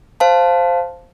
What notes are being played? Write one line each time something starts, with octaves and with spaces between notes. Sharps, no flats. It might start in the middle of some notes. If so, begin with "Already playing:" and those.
C5 F5 A5